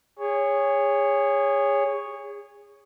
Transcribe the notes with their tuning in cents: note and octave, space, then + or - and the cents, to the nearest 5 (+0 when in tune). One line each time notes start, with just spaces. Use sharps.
G#4 -25 C#5 +5